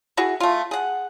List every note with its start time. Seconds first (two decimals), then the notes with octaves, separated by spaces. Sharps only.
0.17 E4 F#4 G#4
0.40 A3 F4
0.71 G#4 F#5